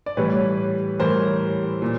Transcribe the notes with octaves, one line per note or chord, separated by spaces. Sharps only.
D5
A2 E3 G3 B4 C#5
A2 E3 G3 A#4 C5
A#2